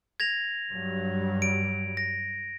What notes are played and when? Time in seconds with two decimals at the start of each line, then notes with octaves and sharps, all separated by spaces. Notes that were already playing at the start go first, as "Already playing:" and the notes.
0.20 G#6 A#6 F7
0.70 G2 F#3 G3
1.42 D7
1.97 A#6